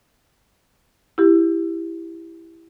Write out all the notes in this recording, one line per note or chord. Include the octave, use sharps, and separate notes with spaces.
E4 G4